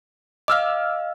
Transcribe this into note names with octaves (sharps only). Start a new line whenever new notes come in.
D#5 F5 D6 E6 F6